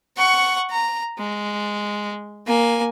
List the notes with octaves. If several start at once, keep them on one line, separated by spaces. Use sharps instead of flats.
F#5 C#6
A#5
G#3
A#3 G#5